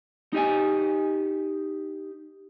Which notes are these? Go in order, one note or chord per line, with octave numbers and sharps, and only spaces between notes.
D#4 G4 D#5 G#5